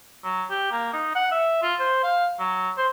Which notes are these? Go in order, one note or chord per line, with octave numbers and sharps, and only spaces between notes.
F#3
G4
A#3
D#4
F#5
E5
F4
C5
F5
F#3
C5